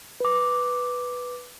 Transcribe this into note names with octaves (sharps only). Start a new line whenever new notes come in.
B4 D6